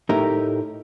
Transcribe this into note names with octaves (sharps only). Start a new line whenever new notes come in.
A2 A3 D#4 G4 A#4